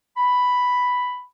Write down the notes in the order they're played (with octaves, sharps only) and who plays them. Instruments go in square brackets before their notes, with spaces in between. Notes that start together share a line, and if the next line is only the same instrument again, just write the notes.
[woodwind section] B5